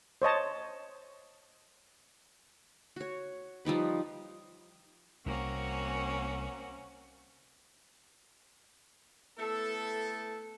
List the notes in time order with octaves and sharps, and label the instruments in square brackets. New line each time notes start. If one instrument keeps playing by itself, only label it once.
[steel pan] C5 C#5 D#5 A5
[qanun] F#4 C#5
F3 G3 D#4 B4
[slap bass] C2 [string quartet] A#3 C4 F#4 [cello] C#4
[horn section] A3 B3 E4 A4